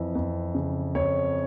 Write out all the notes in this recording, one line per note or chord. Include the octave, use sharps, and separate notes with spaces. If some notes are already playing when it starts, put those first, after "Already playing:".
Already playing: F2 E3
F2
C#3
F2 C#5